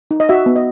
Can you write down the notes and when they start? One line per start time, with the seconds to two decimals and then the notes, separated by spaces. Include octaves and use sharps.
0.11 D#4
0.20 D#5
0.29 F#4 E5
0.46 B3
0.56 D#5